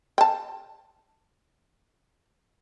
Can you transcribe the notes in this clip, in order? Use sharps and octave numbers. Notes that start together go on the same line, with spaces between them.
G5 A5